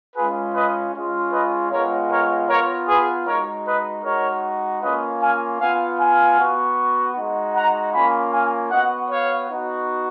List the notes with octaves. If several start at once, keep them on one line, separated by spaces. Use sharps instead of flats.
G#3 C#4 F4 G#4 B4
B4 D#5
G#3 C#4 F4
B4 D#5
G#3 B3 F4 A#4 C#5
A#4 C#5
B3 F4 A#4 C#5
G#4 B4
G#3 D#4 F#4 A#4 C#5
B4 D#5
G#3 D#4 F#4 A#4 C#5
A#3 C#4 F4 B4 D#5
F5 G#5
B3 F4 F5 G#5
F5 G#5
B3 F#4
G#3 D#4 F#4
F#5 A#5
A#3 C#4 F4 G#5 B5
F5 G#5
B3 F#4 D#5 F#5
C#5 F5
B3 D#4 F#4